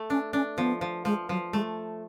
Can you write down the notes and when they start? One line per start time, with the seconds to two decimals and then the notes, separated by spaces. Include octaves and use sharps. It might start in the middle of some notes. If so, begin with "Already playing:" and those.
Already playing: A3
0.10 C#4 D4
0.33 C#4 D4
0.58 F3 B3
0.81 F3
1.05 F3 G#3
1.29 F3 F#3
1.53 G#3 A3